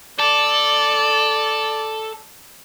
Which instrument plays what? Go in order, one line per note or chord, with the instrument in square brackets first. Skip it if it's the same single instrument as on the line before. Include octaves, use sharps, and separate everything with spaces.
[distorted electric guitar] A4 [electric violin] D5